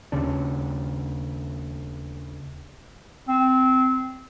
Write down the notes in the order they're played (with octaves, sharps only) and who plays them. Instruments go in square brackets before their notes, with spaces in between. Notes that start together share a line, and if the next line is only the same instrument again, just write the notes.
[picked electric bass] D#2 C#3 D4
[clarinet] C4